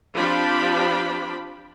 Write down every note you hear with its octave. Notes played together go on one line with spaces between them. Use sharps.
F3 C4 D4 G4 D5 B5